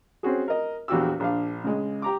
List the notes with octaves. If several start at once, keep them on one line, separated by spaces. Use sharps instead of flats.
C4 C#4 F#4 G#4
A#4 D#5
A#1 E2 F#4 G4 E6
A#1 D4 F5
C#2 G#3
G4 A#5 D6